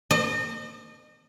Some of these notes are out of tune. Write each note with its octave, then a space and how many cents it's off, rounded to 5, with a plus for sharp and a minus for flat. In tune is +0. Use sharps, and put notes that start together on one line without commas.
D#5 -35